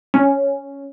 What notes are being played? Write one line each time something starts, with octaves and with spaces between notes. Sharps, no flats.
C#4